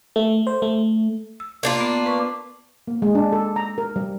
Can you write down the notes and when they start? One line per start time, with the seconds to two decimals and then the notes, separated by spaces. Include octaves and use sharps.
0.16 A3
0.47 C5
0.62 A3
1.40 E6
1.63 A#3 D4 F4
1.81 B3
2.06 B4 C#6
2.88 A#3
3.02 G#3
3.15 D4
3.32 A4
3.56 A#5
3.78 A#4
3.96 G3